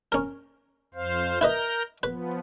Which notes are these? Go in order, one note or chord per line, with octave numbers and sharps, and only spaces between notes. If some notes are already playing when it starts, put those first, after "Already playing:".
C#4 A#4
F2 C5 F5
E4 A#4 B4 D#5 A#5 G6
F3 B3 B4